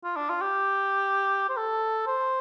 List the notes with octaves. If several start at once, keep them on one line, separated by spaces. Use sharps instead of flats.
F4
D4
F4
G4
C5
A4
C5